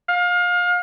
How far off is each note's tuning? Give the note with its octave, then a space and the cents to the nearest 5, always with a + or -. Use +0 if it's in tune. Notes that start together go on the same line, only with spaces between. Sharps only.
F5 +30